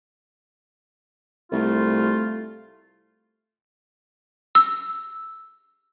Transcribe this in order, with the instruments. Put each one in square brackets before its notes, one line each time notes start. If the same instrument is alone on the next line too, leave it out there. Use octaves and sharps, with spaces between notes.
[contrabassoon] C2 [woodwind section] A3 F4
[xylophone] E6